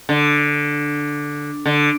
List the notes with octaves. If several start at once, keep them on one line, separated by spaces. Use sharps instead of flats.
D3
D3